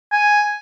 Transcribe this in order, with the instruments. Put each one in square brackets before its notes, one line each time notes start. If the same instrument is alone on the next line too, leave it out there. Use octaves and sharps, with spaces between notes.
[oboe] G#5